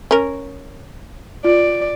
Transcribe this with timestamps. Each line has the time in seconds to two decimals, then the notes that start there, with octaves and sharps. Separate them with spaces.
0.11 C#4 A#4
1.45 F4 D5